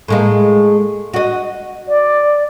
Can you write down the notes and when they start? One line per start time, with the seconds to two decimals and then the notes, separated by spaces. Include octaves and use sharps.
0.08 A2 G#3 A#3
1.13 F#4 D#5
1.88 D5